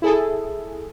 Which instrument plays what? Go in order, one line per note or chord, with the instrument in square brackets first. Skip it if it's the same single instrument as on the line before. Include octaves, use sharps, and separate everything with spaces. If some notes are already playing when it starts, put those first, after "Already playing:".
[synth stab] E4 G#4 A4